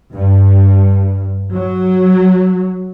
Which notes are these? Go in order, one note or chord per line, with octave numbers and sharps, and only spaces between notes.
G2
F#3